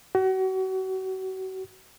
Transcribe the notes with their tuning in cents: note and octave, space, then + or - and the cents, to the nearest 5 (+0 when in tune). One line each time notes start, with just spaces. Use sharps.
F#4 +35